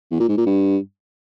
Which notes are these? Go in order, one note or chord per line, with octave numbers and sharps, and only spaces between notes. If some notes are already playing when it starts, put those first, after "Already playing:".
E2
A#2
G#2
A#2
G2